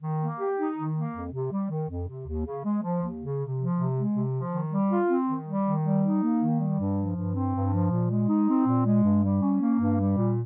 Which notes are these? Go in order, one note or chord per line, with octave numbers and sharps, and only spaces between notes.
D#3
A#3
G4
D#4
D#3
A#3
F2
C3
G3
D#3
F2
C3
D#2
C#3
G#3
F3
D#2
C#3
C3
F3
C3
G#3
C3
F3
D#3
G3
F4
C4
D#3
G3
D#3
G3
D#4
A#3
D#3
G3
G2
F3
G2
C4
G2
F3
A#2
G#3
D#4
C4
A#2
G#3
G2
G3
C#4
A#3
G2
G3
A#2